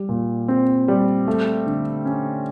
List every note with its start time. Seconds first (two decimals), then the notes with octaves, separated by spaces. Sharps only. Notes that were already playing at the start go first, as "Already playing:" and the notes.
Already playing: G3
0.09 A#2
0.48 C4
0.88 G3
1.28 A3
1.67 D3
2.05 C#4